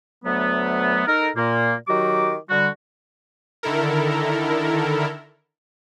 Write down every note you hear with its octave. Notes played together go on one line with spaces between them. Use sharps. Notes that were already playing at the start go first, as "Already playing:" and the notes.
D2 F#3 A3 B3
D#4 A4 A#4
A#2 A#3
D#3 F#3 F#4 G4 D6
D3 G3 F#4
D3 D#3 E4 A4 A#4